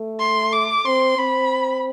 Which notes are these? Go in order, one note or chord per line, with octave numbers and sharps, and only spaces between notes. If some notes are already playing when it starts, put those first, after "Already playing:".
Already playing: A3
C6
D6
C4 C6
C4 B5